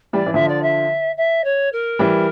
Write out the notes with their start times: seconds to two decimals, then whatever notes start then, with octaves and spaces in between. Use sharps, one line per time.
0.13 E3 G3 D5
0.26 E3
0.34 D3 F3 E5
0.48 D5
0.62 E5
1.17 E5
1.44 C#5
1.72 A#4
1.99 E3 G3